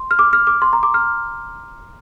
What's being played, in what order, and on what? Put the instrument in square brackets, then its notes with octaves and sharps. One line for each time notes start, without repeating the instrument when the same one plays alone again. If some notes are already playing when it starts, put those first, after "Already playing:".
Already playing: [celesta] C6
F6
D6
F6
D6
C6
A#5
D6
F6